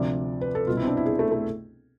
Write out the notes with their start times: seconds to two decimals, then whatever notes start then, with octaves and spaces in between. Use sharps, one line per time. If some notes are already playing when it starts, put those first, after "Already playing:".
Already playing: D2 C3 F3 D5
0.41 B4
0.55 A4
0.67 C2 B2 F4
0.77 E4
0.82 C4
0.87 D4
0.97 E4
1.06 G#4
1.19 A3
1.32 A3